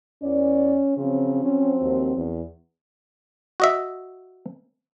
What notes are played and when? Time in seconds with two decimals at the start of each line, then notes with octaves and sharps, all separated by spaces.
0.22 E2 C#4 D5
0.97 C#3 F3 F#3 C4
1.44 C#4
1.82 D#2
2.16 E2
3.60 F#4 D#5 E5